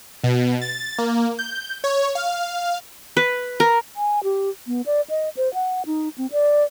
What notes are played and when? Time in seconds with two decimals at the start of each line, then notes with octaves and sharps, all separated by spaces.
0.24 B2
0.62 A6
0.98 A#3
1.39 G6
1.84 C#5
2.15 F5
3.17 B4
3.60 A#4
3.96 G#5
4.24 G4
4.67 B3
4.86 D5
5.10 D#5
5.37 C5
5.54 F#5
5.86 D#4
6.18 C4
6.32 D5